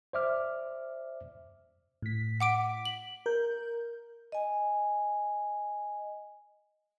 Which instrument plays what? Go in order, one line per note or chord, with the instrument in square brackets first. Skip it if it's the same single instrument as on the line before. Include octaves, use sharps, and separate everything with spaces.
[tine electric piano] C5 D5 E5 D6 F6
[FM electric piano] A2 B6
[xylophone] F#5 D6 D7
F#7
[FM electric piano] A#4 G6
[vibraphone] D#5 G#5